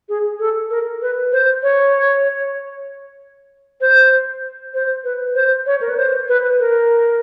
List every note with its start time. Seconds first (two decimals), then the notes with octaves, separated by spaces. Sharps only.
0.09 G#4
0.40 A4
0.70 A#4
1.02 B4
1.32 C5
1.63 C#5
3.81 C5
4.74 C5
5.04 B4
5.35 C5
5.66 C#5
5.81 A#4
5.89 B4
5.97 C5
6.28 B4
6.59 A#4